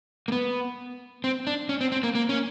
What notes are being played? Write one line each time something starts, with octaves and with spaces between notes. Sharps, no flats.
A#3
B3
C4
D4
C#4
C4
C4
A#3
A#3
C#4